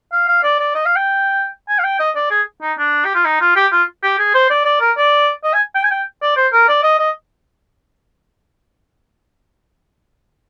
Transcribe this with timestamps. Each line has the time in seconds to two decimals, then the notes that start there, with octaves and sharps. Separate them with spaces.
0.12 F5
0.28 F5
0.43 D5
0.59 D5
0.75 D#5
0.85 F5
0.96 G5
1.69 G#5
1.79 F5
1.84 G5
2.00 D#5
2.16 D5
2.31 G#4
2.62 D#4
2.78 D4
3.05 G4
3.15 F4
3.25 D#4
3.41 F4
3.56 G4
3.72 F4
4.03 G4
4.19 G#4
4.34 C5
4.50 D5
4.65 D5
4.81 A#4
4.97 D5
5.44 D#5
5.54 G#5
5.75 G5
5.84 G#5
5.91 G5
6.22 D5
6.36 C5
6.53 A#4
6.68 D5
6.83 D#5
6.99 D#5